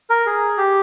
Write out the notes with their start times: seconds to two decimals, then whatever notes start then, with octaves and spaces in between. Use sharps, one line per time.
0.10 A#4
0.26 G#4
0.58 G4